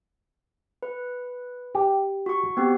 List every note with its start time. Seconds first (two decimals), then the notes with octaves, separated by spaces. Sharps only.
0.83 B4
1.75 G4
2.26 F#4 C#6
2.57 B3 C4 G4